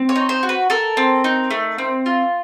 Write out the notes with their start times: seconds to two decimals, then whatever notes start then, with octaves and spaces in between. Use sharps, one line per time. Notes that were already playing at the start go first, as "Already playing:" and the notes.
Already playing: C4
0.09 C#5
0.16 D#4
0.29 C5
0.43 F#4
0.49 B4
0.70 A4 A#4
0.97 C4
1.24 D#4
1.51 A3
1.78 C4
2.06 F4